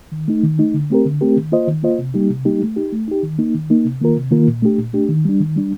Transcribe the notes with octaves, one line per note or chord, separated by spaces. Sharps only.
D#3
A3 D#4
D#3
A3 D#4
D3
A3 C4 G4 A#4
D3
A3 C4 G4 A#4
D#3
A#3 F4 C5 D#5
D#3
A#3 F4 C5 D#5
C3
G3 A#3 D#4 G4
C3
G3 A#3 D#4 G4
A3
D#4 G4
A3
D#4 G4
D#3
A#3 D#4
D#3
A#3 D#4
C3
D#3 A#3 F4 A#4
C3
D#3 A#3 F4 A#4
A#2
A3 D4 G4
A#2
A3 D4 G4
D#3
G3 D4
D#3
G3 D4